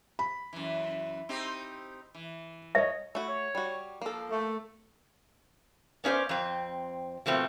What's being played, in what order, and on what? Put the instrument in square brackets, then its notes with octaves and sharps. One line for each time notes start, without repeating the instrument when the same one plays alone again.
[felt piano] B5
[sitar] F#2 E3
C4 D#4 G4
E3
[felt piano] C#5 D#5 [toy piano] E5
[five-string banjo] A3 F#4 [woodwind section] E4
[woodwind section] C#5
[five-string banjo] G3 F#4
[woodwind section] F3 [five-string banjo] A#3 A4
[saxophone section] A3
[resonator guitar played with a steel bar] B3 C#4 E4 C5 D5
F2 C4
B2 F3 A3 C4